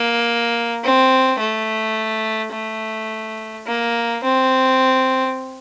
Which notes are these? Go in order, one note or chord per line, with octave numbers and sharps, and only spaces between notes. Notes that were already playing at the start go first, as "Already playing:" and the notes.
Already playing: A#3
C4
A3
A3
A#3
C4